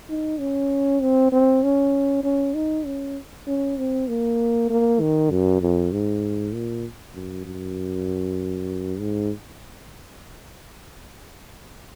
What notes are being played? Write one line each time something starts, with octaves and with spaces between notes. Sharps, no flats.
D#4
C#4
C4
C4
C#4
C#4
D#4
C#4
C#4
C4
A#3
A#3
D#3
F#2
F2
G#2
A#2
F#2
F#2
G#2